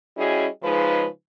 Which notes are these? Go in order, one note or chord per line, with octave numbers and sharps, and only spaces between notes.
G3 C#4 E4 F#4 G#4 D#5
C#3 F3 G#3 D#4 B4